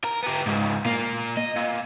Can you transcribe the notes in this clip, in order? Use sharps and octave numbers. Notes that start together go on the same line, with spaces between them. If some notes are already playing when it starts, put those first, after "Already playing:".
A#4
B3 G4
C#2 G#2
A#2 A#3
D#5
A#2